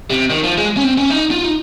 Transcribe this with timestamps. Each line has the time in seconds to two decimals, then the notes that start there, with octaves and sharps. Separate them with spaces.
0.10 C3
0.30 D#3
0.44 F3
0.58 G#3
0.77 C#4
0.83 C4
0.98 C#4
1.10 D#4
1.31 F4
1.44 D#4